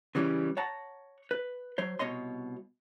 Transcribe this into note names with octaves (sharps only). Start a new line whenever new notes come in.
C#3 E3 G3 C4 C#4
C#5 F#5 A5 A#5
B4
F#3 C5 C#5
C2 B2 C#5 D#5 C6